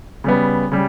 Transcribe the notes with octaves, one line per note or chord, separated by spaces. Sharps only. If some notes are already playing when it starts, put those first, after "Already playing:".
C#3 G3 B3
C#3 G3